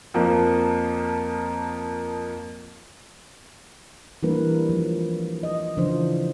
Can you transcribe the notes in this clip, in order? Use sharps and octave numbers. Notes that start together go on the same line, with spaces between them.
F2 F3 A#3
E3 G3 A#3 D4 A#4 B4
F3 G#3
D#5
C#3 E3 F3 D4 F4 C5